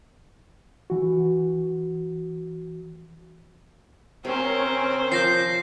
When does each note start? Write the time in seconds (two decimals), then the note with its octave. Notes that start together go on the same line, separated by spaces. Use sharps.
0.90 E3 F#4
4.25 C3 C4 C#4 A#4
5.12 F3 A5 G6 A#6 C7